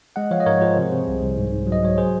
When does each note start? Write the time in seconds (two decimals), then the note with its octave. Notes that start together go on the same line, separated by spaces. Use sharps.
0.16 G#3 D#5 F#5
0.31 F3 C#5 F5
0.40 D#5
0.46 G#2 A#4 C#5
0.61 F3 G#4 C5
0.77 C3
0.92 C3
1.07 C2
1.22 C2
1.37 G#2
1.52 G#2
1.67 F#3
1.72 D#5
1.82 F#3 C#5
1.98 G#4 C5